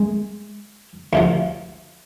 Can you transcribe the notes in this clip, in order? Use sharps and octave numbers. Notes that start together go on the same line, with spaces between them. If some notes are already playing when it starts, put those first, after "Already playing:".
Already playing: G#3
D2 C3 F3